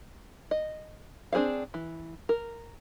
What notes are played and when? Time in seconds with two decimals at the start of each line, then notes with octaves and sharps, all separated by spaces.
0.51 D#5
1.32 C4 D4 G#4 C5 F5
1.74 E3
2.29 A#4